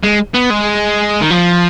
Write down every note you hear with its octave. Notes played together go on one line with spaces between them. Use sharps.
G#3
B3
G#3
D#3
F3